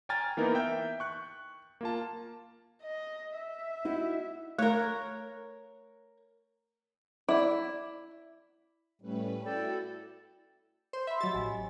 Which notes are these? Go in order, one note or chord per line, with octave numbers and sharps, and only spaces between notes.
G5 G#5 A#5 F6 G#6 A6
E3 A#3 B3 D#4 A#4
E5 G5 G6
C#6 F#6
A#3 F4 A5
D#5
E5
D#4 E4 F#4
A3 A#4 C#5
E4 D5 D6
A2 G3 A3 C#4 B4
E4 F#4 A4 D5 G5
C5
E5 B5 C6
F#3 G4 D#5 A6
A1 G#5